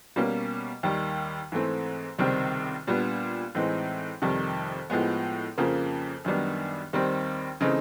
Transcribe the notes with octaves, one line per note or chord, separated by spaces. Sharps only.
B2 G3 A#3 C#4
D#2 D#3 G3
G#2 E3 A3 C4
C#2 C3 D#3 G3 C4
A#2 G3 B3 D4
A2 E3 G#3 C4 D#4
F2 C3 D#3 G3
A2 F3 G#3 B3
F2 C#3 F3 A#3
F#2 D#3 G3 B3 D4
D#2 D#3 G3 C4
C#3 E3 A3 C4 D#4